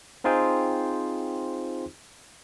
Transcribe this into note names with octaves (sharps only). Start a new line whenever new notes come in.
C4 D#4 F4 G#4 C5 G5